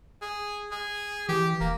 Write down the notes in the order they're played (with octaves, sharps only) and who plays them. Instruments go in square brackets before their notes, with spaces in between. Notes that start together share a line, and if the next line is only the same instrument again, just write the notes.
[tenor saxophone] G#4
G#4
[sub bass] E3 [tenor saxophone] G4
[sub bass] E1 [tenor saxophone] A#3